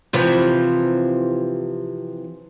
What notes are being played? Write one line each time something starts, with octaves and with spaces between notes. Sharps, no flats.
C3 E3 F3